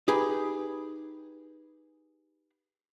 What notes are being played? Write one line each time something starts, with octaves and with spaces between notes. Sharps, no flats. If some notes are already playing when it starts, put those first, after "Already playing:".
D#4 G4 G#4 B4